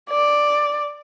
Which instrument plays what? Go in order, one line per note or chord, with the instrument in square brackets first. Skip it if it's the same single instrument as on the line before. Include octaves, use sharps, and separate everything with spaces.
[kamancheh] D5